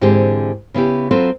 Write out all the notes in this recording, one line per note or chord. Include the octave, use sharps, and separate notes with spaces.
G#2 D3 E3 C4 G4 G#4
C#3 B3 E4 G4
F#3 C4 F4 A4 B4